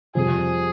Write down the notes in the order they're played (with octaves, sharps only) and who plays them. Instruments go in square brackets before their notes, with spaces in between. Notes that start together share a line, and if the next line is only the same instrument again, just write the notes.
[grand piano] F2 C3 G3 [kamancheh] G#4